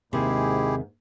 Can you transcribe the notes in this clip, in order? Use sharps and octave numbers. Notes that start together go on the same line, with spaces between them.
D#2 G#2 C3 E4 G4 G#4